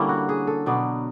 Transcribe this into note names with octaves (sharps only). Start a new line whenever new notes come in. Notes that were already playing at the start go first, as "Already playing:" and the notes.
Already playing: D3 G3 A#3 C#4 E4
F#4
G#4
A4
B2 F#3 B3 D5